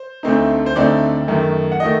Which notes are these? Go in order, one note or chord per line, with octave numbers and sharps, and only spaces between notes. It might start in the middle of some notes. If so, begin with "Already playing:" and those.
Already playing: C5
D2 D3 A3 C4 D#4
C5
D2 D3 A3 C4 D#4 D5
F#2 D#3 A3
F#5
D#3 A3 D#5